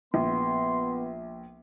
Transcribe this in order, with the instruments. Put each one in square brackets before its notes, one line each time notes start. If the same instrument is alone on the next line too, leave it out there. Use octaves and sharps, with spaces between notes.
[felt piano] A#1 [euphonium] B3 [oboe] C6